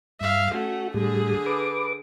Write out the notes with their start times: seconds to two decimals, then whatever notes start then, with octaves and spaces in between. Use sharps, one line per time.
0.21 G2 E5 F5
0.54 A3 C#4 F#4
0.94 A2 D3 G3 G#4
1.46 B4 D6